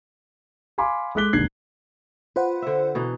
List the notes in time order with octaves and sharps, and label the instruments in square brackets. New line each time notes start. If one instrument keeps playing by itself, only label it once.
[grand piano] F5 G#5 B5 C6 D6
G#3 A4 D6 F#6 B6 G7
E1 D#2 D3 G#6 C7 F#7
[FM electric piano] F4 C5 F#5 [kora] B4
[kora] D3 E5
B2 E3 D#4